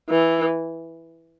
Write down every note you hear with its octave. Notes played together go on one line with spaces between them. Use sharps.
E3